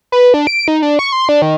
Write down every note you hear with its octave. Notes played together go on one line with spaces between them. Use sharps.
B4
D4
D7
D#4
D4
C#6
C6
D4
D#3